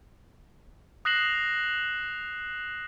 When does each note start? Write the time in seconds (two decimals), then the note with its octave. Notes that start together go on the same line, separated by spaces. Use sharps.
1.05 D#6 F#6 A#6 C7 E7 F#7